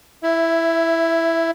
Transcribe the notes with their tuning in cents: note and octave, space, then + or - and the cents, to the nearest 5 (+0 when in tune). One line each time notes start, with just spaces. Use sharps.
E4 +5 E5 +25